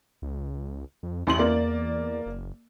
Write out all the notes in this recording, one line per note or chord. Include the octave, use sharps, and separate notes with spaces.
C#2
F2
A1 E2 C6 F#7
A#3 D5
F#1